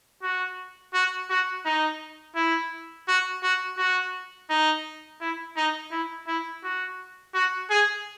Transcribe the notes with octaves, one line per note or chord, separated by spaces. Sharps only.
F#4
F#4
F#4
D#4
E4
F#4
F#4
F#4
D#4
E4
D#4
E4
E4
F#4
F#4
G#4